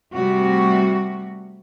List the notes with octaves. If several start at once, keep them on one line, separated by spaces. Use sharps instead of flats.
C3 G3 A3 F#4